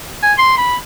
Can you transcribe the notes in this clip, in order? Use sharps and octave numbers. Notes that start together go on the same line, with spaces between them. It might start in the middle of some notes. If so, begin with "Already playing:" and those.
G#5
C6
B5